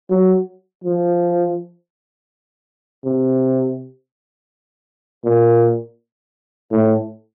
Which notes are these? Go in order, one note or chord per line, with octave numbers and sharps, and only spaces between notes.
F#3
F3
C3
A#2
A2